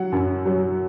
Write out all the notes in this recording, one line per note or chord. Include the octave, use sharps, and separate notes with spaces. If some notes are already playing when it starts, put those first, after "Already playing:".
Already playing: F#3 F#5
F#2
F#3